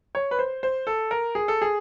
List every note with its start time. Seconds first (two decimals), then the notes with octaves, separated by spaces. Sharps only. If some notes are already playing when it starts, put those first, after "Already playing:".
0.15 C#5
0.31 B4
0.39 C5
0.63 C5
0.87 A4
1.11 A#4
1.35 G#4
1.48 A4
1.62 G#4